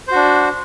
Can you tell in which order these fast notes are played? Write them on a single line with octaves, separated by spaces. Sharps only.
C5 F#4 D4